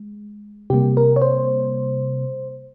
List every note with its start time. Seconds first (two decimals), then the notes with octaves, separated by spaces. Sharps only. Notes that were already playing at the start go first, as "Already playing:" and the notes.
Already playing: G#3
0.70 C3 G3 A#3 G4
0.97 A#4
1.16 C#5
1.22 C5